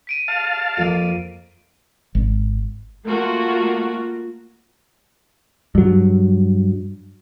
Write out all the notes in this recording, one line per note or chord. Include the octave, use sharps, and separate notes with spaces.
B6 D7 D#7
F5 A5
F2 A#3
G#1
A3 A#3 F4 F#4 A#4
G2 F#3